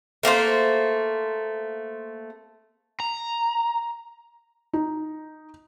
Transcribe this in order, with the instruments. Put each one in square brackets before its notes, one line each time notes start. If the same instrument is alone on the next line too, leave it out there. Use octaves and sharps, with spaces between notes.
[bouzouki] A3 A#3 A#4 C5
[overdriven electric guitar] A#5
[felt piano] D#4